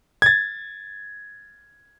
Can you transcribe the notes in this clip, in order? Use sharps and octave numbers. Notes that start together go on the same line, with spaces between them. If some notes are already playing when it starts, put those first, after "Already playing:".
G#6 A6